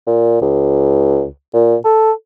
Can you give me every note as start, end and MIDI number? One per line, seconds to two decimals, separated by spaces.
0.07 0.40 46
0.41 1.26 37
1.54 1.75 46
1.84 2.11 69